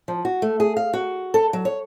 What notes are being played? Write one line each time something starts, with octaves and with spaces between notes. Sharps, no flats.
F3
F#4
A3
G#4
F5
F#4
A4
F#3
C#5